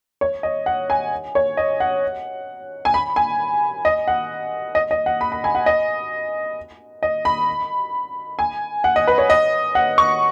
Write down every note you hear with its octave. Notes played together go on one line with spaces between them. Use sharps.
C#5
D#5
F#5
G#5
C#5
D#5
F#5
G#5
B5
G#5
D#5
F#5
D#5
D#5
F#5
B5
B5
G#5
F#5
D#5
D#5
B5
G#5
F#5
D#5
B4
C#5
D#5
F#5
C#6